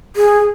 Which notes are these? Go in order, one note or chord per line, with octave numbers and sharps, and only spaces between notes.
G#4